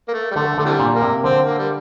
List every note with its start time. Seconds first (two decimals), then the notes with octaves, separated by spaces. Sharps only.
0.08 A#3
0.14 A3
0.31 G3
0.35 D3 A3
0.58 D3 A3
0.65 C3 E3 G3
0.80 A#2
0.95 A#3
1.02 C3
1.24 D3 C4
1.46 A#3
1.58 G3